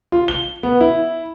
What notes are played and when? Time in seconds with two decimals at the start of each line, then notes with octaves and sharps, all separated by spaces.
0.12 F4
0.28 G7
0.63 B3
0.81 E4